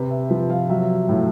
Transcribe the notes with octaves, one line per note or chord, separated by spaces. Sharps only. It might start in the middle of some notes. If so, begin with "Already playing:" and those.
Already playing: C3 B4
E5
F3 B4
F5
F#3 E5
A2